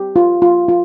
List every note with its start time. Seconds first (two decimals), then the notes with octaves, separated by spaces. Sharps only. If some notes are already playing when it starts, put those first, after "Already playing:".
Already playing: G4
0.16 F4
0.42 F4
0.68 F4